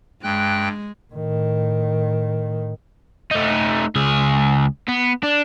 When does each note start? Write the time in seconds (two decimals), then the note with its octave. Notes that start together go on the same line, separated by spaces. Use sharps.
0.23 G2 G#3 G5 F#6
1.13 A2 D#3
3.31 A3 D#4
3.95 C#2 G#4
4.88 B3
5.23 D4